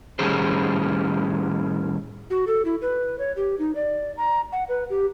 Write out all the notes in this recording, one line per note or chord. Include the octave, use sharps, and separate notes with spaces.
A2 D#3 G3 C#4 G#4 C5
F#4
A4
E4
B4
C#5
G4
D#4
D5
A#5
F#5
B4
G4